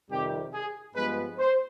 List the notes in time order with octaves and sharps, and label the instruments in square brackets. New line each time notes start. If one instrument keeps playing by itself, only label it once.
[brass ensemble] F2 C3 D#3 G3 G4
G#4
G2 F3 G#3 B3 B4
C5